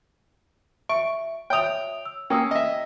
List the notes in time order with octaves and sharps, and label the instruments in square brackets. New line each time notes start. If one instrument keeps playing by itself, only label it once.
[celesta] E5 D7 [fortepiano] C#6
[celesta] C#5 E5 F7 [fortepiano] G5 D#6
[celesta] E6
[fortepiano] A#3 C#4 [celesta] G5 D#6 E6
[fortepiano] D#5 E5